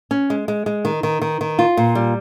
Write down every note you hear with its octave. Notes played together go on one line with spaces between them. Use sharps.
C#4
G#3
G#3
G#3
D#3
D#3
D#3
D#3
F4
A#2
G3